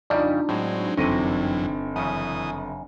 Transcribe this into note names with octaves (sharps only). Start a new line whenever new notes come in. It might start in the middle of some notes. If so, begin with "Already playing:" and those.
F2 C#3 G3 D4 D#4 F4
A2 F#3 G#3 C4
G1 F#2 C3 E3 C4 D#5 C#6
F#2 C#3 E3 D#6